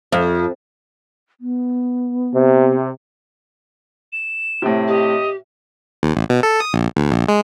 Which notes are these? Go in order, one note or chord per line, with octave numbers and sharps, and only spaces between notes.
F2
B3
C3
E7
A2 C3
G4 D#5
D#2
A1
B2
A4
D#6
A#1
D2
A#1
G#3